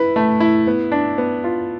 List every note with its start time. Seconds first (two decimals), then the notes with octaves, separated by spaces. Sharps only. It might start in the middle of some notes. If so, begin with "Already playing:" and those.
Already playing: E4 B4
0.16 A3
0.40 E4
0.67 B3
0.92 D4
1.18 B3
1.44 F4